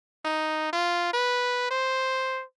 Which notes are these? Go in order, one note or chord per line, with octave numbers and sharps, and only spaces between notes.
D#4
F4
B4
C5